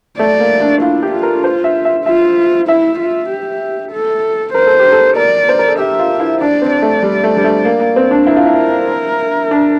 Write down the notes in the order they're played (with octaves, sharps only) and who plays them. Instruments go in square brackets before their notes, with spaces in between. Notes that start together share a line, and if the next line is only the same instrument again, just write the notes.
[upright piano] A3 [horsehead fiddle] D5
[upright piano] A#3
D4
[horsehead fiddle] E4 [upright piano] F4
[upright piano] G4
[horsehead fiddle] F4
[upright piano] A#4
C5
E5
E5
[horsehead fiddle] F4 [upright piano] E5
[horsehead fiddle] E4 [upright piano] E5
[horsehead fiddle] F4
G4
A4
[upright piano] A#4 [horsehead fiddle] C5
[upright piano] A4
G4
A4
[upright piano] A#4 [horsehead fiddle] D5
[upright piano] C5
A#4
A4
[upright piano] G4 [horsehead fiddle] E5
[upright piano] F4
E4
[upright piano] D4 [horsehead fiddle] D5
[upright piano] C4
[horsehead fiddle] D5
[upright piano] A3
G3
A3
G3
A3
A#3
A#3
C4
D4
[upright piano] E4 [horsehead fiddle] A#4
[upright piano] F4
E4
D4